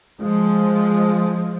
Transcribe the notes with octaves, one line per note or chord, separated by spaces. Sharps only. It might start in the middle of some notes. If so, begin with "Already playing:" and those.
F3 G#3